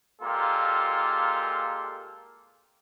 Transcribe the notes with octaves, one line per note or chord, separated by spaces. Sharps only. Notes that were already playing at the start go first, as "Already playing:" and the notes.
A#2 G#3 A#3 F4 G4 A4